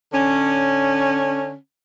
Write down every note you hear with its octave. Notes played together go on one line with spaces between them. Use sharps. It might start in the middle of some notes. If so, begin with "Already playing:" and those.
D3 C#4